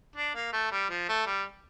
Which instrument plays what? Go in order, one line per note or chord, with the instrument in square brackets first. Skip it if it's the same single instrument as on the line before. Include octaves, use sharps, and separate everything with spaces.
[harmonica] D4
A#3
A3
G3
F3
A3
G3